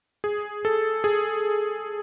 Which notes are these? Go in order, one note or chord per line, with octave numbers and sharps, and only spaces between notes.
G#4
A4
G#4